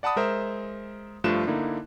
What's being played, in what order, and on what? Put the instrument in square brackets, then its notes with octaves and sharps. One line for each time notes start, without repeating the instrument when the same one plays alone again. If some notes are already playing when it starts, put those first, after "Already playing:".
[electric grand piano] D5 F#5 A5 B5 D#6
G#3 A#4 C5 E5
G2 F3 A3 F4 F#6 E7
D3 A#3 D#4 E4